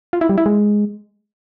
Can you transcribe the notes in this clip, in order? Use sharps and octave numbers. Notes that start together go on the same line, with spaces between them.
F4
E4
G3
E4
G#3